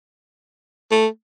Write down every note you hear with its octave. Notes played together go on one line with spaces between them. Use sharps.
A3